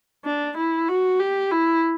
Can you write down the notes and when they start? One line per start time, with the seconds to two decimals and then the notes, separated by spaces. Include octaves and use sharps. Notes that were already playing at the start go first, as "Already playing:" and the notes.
0.24 D4
0.57 E4
0.88 F#4
1.20 G4
1.51 E4